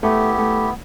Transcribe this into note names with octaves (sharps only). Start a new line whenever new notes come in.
A3 B3 E4 G4
A3